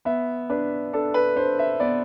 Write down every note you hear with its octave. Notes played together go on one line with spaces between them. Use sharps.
B3 E5
D4 B4
D4 A4
B4
D4 C5
E5
B3 D5